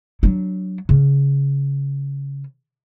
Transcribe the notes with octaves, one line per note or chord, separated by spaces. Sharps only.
F#3 D4
C#3